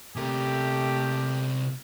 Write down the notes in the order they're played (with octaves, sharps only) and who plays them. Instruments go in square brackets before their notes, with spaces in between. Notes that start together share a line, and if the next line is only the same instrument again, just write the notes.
[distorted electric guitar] C3 A#4 [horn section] A3 G4